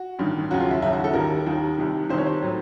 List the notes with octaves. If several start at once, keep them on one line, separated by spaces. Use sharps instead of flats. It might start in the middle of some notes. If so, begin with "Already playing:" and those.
Already playing: F#4
A1 G2 D#3
D#2 C#3 F#3 F#4
F4
E4
D#2 C#3 F#3 E4
F#4
A4
D#2 D#3 G3 A#4
D#2 D#3 G3
C2 C3 D#3
C2 C3 D#3 C5
C#5
C5
A2 F#3